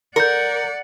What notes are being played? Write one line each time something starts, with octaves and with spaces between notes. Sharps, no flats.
A#4 D5 F#5 G6 C#7